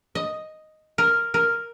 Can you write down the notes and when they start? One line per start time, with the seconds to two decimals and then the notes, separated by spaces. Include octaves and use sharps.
0.15 D#5
0.98 A#4
1.34 A#4